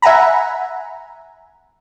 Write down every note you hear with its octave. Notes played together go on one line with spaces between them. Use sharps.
E5 F#5 G#5 A#5 B5